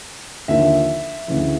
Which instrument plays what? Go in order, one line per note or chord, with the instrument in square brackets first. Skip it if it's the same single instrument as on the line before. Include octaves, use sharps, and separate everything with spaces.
[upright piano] D#2 D3 F3 E5
D2 C#3 E3